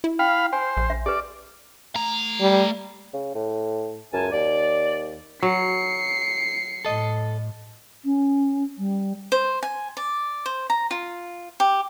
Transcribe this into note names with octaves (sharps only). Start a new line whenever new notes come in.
E4
F5 G5 B5
C5 G#5
A#1
E5
G4 B4 D5
A3 A#5
G3
C#3
A2
C#2 F#2 G#5 A5
D#2 D5
F#3 C7 C#7
A2 A4 D#5
C#4
G3
C5
G#5
D5
C5
A#5
F4
G4